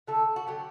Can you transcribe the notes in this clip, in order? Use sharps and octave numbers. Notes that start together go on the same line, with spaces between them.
D3 F#3 A3 A4
F#4
D3 F#3 A3 G4